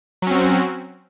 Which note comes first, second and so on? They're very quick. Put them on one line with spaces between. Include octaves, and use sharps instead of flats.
F#3 C#4 C4 F#4